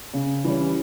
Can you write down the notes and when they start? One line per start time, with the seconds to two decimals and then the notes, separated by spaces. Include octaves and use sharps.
0.13 C#3
0.44 E3 G3 C#4